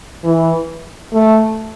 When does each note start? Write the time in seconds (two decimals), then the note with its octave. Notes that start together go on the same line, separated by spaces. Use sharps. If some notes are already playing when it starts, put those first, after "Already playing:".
0.24 E3
1.13 A3